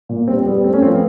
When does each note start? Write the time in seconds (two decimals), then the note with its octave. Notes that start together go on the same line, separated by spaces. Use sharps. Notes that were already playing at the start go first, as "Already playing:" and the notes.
0.09 A#2
0.28 G3 C4
0.46 G3 B3
0.64 A3 C4
0.74 C#4
0.82 F3 C4
0.92 B3